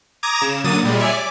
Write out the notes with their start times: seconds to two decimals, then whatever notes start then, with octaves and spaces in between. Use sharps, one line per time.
0.23 A#5 D6 D#6 G#6 A#6
0.41 C#3 E7
0.64 D3 F#3 A#3 D#6 A6 D#7
0.83 A#2 G3 G#3
0.98 C#5 D5 E5 G#5
1.13 D6